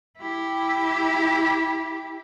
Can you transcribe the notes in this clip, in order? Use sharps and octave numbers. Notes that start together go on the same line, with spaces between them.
E4 G4